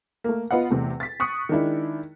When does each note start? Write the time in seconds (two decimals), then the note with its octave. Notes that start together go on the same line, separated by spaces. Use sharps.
0.24 A3 A#3
0.51 B3 F4 B4 D#5 F#5
0.70 E2 C3 A3
1.00 A6 B6
1.20 C#6 D#6 F#6 C#7
1.49 D#3 G#3 D4 E4